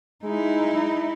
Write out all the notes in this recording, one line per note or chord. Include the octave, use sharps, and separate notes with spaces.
G#3 D#4 E4